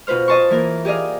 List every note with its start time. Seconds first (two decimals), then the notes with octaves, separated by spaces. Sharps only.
0.07 B2 F4 B4 C5 F6
0.28 D#5 A5 C6 C#6
0.50 E3 A#3 A#4
0.85 G4 G#4 D5 D#5 F5